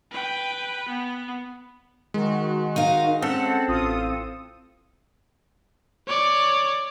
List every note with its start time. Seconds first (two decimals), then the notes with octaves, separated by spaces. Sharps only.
0.11 B4 G5
0.89 B3
2.14 D#3 G#3 F#4
2.76 D#4 A#4 F5
3.22 C4 C#4 A4 F#5
3.68 A1 F4 D#6
6.08 C#5 D5